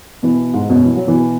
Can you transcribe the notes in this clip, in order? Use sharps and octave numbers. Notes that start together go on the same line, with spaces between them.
B2 E3
G#2
F#2 B2
E3
F#3
B2 E3